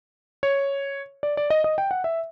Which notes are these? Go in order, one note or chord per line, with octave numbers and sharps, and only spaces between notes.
C#5
D5
D5
D#5
D#5
G5
F#5
E5